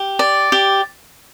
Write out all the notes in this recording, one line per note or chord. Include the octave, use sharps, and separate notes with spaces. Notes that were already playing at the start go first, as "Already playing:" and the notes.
Already playing: G4
D5
G4